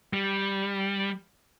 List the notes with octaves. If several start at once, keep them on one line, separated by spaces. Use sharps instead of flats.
G3